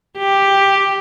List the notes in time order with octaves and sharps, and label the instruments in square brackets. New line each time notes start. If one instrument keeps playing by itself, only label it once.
[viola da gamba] G4